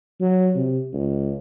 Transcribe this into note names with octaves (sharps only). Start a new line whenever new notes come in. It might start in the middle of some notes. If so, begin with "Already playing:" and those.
F#3
C3
C#2